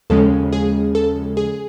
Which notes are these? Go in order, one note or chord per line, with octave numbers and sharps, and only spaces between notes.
D#2 C#3 F3 G#3 C#4 A4
G#4
A4
G#4